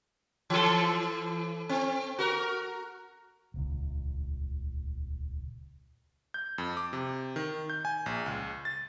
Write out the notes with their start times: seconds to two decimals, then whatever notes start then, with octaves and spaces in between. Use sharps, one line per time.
0.50 E3 A4
1.69 C4
2.18 F#4 A#4
3.54 D#1 C#2
6.34 G6
6.58 F2
6.77 D6
6.93 C3
7.36 D#3
7.70 G6
7.85 G#5
8.06 A#1
8.26 C#2
8.65 A6